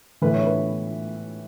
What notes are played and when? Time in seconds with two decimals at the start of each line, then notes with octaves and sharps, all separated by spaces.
0.22 A2 E3 B4
0.34 C#5
0.47 B4